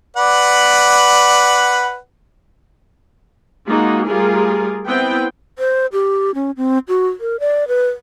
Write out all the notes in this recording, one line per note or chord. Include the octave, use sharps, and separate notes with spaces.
B4 D5 F#5
G#3 A#3 D#4 F4 F#4
G3 A3 F4 G#4 A#4
B3 C4 E4 B4 G5
C5
G4
C#4
C4
F#4
A#4
D5
B4